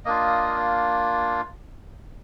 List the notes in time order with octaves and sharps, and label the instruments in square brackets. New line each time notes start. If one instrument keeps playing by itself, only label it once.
[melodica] A#3 D4 F4 D#5